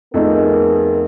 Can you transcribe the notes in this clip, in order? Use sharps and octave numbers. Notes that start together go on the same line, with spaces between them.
F2 A3 B3 D#4 G#4 A#4